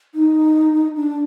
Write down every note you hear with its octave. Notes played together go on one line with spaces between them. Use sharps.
D#4
D4